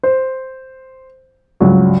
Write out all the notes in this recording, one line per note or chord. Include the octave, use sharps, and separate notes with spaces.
C5
C#2 G2 F#3